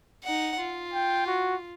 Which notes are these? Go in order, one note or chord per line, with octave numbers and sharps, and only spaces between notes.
D#4 F#5
F4
G5
F#4